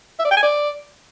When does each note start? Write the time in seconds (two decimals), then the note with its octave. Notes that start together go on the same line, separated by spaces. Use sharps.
0.19 E5
0.25 D5
0.31 G5
0.37 G#5
0.43 D5